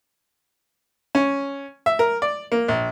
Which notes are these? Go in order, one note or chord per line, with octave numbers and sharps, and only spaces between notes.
C#4
E5
A#4
D5
A#3
A#1